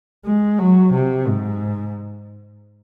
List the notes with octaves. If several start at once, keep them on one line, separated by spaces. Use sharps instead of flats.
G#3
F#3
C3
G#2